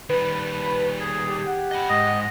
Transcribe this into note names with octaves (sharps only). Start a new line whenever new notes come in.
D#3 G3 B4
G#4
G4
F#5
D#5 B5
G#2 D#5